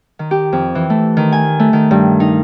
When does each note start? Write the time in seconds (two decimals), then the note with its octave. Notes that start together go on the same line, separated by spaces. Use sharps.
0.19 D#3
0.31 G4
0.53 F2
0.75 E3
0.90 A3
1.17 D#3
1.32 G#5
1.59 A3
1.73 D#3
1.91 G2
2.20 D#4